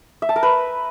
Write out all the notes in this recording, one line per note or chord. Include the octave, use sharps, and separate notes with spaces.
E5
A5
A#4
B4